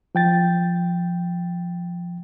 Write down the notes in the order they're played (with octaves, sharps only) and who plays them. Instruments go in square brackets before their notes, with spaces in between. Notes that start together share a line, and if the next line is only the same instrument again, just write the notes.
[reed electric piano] F3 G5 A6